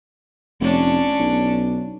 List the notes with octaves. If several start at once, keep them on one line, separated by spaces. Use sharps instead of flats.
F1 C#4 D4
B1